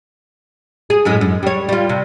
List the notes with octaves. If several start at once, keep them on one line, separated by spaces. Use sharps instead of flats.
G#4
F#2 A2 G#3
F#2
G3 C#5
G3 F4
C3